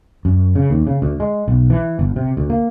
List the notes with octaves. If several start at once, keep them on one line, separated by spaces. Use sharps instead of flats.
F#2
C#3
D#2
C#3
D2
G#3
B1
E3
G1
C3
D2
A#3